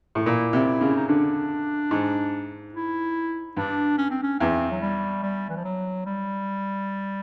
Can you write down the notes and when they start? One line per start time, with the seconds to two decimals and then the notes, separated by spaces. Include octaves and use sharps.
0.15 A2
0.26 A#2 E4
0.53 C3
0.81 C#3
0.97 D#4
1.08 D3 D4
1.91 G#2
2.74 E4
3.57 G2 D4
3.98 C#4
4.11 C4
4.23 C#4
4.40 E2 C4
4.71 F#3
4.81 G3
5.23 G3
5.49 E3
5.57 F3
5.64 F#3
6.06 G3